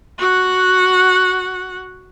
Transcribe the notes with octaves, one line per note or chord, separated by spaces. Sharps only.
F#4 F#5